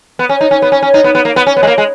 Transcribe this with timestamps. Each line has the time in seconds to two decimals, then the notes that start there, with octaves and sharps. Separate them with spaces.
0.19 B3
0.29 C#4
0.41 D#4
0.51 C#4
0.62 B3
0.72 C#4
0.83 C#4
0.94 D#4
1.04 B3
1.15 B3
1.25 A#3
1.36 B3
1.47 C#4
1.57 B3
1.63 G#3
1.67 A#3
1.78 G#3